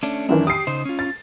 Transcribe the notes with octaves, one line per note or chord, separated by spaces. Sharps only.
A3 C#4 D4
F#2 D#3 E3 D4
G4 D#6 C7
C#3 D#4 C5
C#4 F4
A6